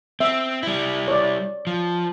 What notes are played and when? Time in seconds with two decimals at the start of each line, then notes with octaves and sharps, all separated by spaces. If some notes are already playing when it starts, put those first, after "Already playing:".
0.20 C4 E5
0.63 G3 E4
1.08 C#5 D5
1.67 F3